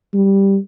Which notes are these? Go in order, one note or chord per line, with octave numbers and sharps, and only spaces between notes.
G3